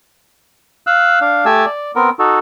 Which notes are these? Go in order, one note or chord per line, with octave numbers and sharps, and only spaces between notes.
F5 E6 F#6
D4 F5
A3 G4 G#5 A5 E6
D5
B3 C4 A#4
D#4 F#4 A4